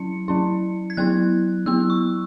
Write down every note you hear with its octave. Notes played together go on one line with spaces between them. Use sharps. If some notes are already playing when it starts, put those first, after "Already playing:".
Already playing: F#3 C#4 E4 C#7
F#3 C#4 E4
G#6
F#3 B3 E4 F#6
F#3 B3 E4 E6
C#6